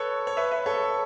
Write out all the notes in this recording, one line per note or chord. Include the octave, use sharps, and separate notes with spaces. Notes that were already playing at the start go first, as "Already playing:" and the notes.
Already playing: A4 B4 C#5
C#5
B4 E5
B4 E5
A4 C#5